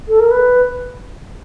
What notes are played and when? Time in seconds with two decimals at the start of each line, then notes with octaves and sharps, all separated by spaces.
0.08 A4
0.20 A#4
0.31 B4